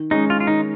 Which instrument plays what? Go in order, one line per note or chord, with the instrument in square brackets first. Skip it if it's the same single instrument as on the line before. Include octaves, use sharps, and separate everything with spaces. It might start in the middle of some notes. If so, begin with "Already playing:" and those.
Already playing: [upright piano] D#3
[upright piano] G#3 C#4 [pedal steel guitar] D#4
[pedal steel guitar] F4
F4
[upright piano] D#3 [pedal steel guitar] D#4